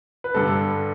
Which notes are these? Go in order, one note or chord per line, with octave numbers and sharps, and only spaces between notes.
B4
G2 D3 A4